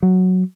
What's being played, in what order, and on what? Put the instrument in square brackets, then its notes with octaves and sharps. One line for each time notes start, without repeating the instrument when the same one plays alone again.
[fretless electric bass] F#3